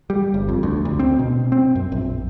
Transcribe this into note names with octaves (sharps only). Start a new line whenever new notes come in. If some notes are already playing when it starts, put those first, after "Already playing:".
G3
G1
F2
D2
D2
C4
B2
C4
F#2
A#1